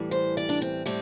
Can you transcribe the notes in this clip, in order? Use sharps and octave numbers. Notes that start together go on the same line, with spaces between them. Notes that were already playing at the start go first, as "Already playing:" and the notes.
Already playing: A2 E3 G3
C5
D5
D4
C4
A2 G3 C4